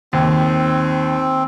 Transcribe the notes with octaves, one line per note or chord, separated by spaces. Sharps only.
D#2 C4